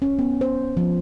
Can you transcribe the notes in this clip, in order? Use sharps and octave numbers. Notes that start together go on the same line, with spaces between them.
C#4
B3
C5
F3